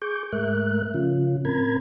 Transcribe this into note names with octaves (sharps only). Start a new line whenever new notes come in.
G#4 C#6 D6 G6
G#2 G#3 A3 A#4 E5 F#6
C#3 F3 C#4 F4
A2 C4 A#4 A#5 B5 G#6